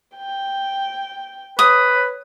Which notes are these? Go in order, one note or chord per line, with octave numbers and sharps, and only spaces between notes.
G5
B4 C#5 D#6